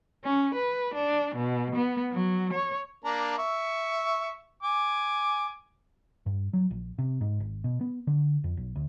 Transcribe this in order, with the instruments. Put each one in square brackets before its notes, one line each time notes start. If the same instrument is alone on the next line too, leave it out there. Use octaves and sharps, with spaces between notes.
[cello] C#4
B4
D4
B2
B3
F#3
C#5
[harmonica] A#3 D4 A#5
E5 C#6
G#5 D6
[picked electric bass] G2
F#3
A#1
C3
G#2
G#1
B2
B3
D3
F2
B1
D2